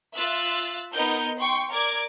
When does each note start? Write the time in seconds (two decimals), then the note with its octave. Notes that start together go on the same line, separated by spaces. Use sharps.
0.15 F4 E5 E6 F#6 A6
0.93 B3 D#4 A#4 G6
1.38 G5 C6 C#6
1.70 A#4 D5 D6 G#6